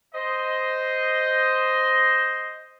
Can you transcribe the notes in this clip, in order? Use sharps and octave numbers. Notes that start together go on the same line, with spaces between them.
C5 D#5